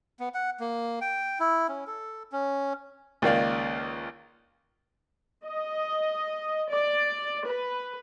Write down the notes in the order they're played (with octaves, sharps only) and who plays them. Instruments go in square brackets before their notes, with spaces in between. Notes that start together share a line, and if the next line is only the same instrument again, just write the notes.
[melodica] B3
F#5
A#3
G5
E4
C#4
A4
C#4
[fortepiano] C#2 D#3 A#3 D5 F5
[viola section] D#5
D5
B4